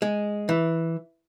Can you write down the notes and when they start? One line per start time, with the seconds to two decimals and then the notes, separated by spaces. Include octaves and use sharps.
0.02 G#3
0.49 E3